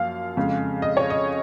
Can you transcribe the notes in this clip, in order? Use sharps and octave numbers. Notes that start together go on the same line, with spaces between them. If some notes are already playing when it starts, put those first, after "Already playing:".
Already playing: F#2 F3 A#3 F5
F2 C#3 G#3
D#5
C#5
D#5